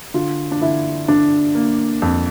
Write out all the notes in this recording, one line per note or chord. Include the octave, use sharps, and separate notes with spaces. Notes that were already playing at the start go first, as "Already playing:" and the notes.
D3 F4
D4
D3 E4
D3 D4
A#3
F2